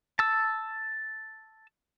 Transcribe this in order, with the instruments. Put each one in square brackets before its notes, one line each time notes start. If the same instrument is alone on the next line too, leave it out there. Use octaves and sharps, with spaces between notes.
[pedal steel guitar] A5 E6